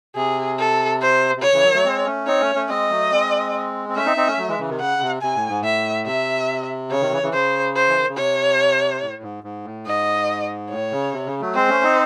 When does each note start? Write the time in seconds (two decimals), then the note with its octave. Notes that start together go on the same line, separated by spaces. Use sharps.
0.16 C3 G#4
0.59 A4
1.01 C5
1.37 C3
1.42 C#3 C#5
1.53 C#3 E3
1.63 D#3 F#3
1.74 F#3 A3
1.85 G#3 C4
2.05 A3 C#4
2.27 C4 D#4 C#5
2.41 A3 C#4
2.55 A3 C#4
2.69 G#3 C4 D#5
2.91 F#3 A3
3.11 G#3 C4
3.89 C4
3.95 A3 C#4 E5
4.06 C4 D#4
4.17 C4 D#4
4.27 A3 C#4
4.38 F#3 A3
4.48 E3 G#3
4.59 C#3 E3
4.69 C3 D#3
4.80 C#3 F#5
5.02 C3
5.22 C3 G#5
5.36 A2
5.49 G#2
5.62 A2 E5
6.06 C3 E5
6.91 C#3 C#5
7.01 C3 D#3
7.12 C#3 E3
7.23 C#3 E3
7.33 C#3 C5
7.76 C5
7.88 E3
7.98 D#3
8.08 C#3
8.17 C3 C#5
9.01 A2
9.23 G#2
9.44 G#2
9.65 A2
9.86 G#2 D#5
10.71 A2 C#5
10.92 C#3
11.13 C3
11.27 C#3
11.41 F#3 A3
11.54 G#3 C4 C5
11.69 A3 C#4
11.83 C4 D#4